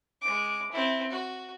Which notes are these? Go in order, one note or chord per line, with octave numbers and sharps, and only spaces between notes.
G#3 D6
C4 E4
F#4